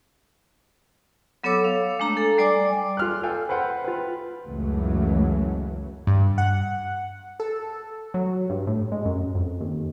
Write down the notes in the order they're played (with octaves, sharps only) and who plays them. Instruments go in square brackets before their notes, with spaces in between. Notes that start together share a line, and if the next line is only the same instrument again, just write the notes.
[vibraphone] F#3 B3 A4 C#5 D6 E6
F5
G#3 A3 D4 A#5
A4
G3 D5 G#5 D6
[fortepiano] F4 F6 F#6
A4 F5 G5 G#5
B4 C5 F#5 G5 C6
F4 B4
[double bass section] C#2 F#2 C#3 E3 F#3 A3
[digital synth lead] G2
F#5
A4
[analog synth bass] F#3
G2
A2
G#3
F#2
F2
D#2